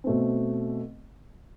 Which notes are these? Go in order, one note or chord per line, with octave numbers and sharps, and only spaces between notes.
B2 A3 C4